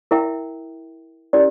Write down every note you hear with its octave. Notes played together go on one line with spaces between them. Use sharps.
E4 A#4 E5 G5
C#4 E4 G4 A#4 D5